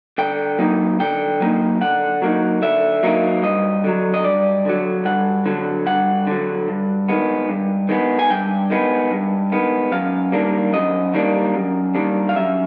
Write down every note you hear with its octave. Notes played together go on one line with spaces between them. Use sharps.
D3 G5
F#3 A#3 D#4
D3 G5
F#3 A#3 D#4
D3 F#5
F#3 A#3 D#4
D3 E5
F#3 A#3 D#4
G2 D#5
D3 F#3
D#5
G2 D5
D3 F#3
G2 F#5
D3 F#3
G2 F#5
D3 F#3
G2
D#3 G#3 B3
G2
D#3 G#3 B3
G#5
G2 G5
D#3 G#3 B3
G2
D#3 G#3 B3
F#2 F5
D#3 G3 A#3 D4
F#2 D#5
D#3 G3 A#3 D4
F#2
D#3 G3 A#3 D4
F5
F#2 E5